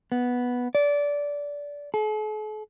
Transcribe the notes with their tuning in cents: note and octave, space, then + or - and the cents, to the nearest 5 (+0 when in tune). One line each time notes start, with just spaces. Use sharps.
B3 -5
D5 -20
A4 -45